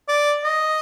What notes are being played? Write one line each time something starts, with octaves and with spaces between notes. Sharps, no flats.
D5
D#5